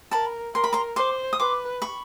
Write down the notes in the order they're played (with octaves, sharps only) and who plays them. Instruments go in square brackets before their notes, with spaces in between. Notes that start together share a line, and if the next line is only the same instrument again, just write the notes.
[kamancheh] A#4 [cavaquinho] A5 B5
[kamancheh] A#4 [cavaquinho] C6
[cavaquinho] B5
A#5 C6
[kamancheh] C5 [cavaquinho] C6 D6
[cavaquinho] D#6
[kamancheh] B4 [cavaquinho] C6 D6
[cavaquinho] B5 C#6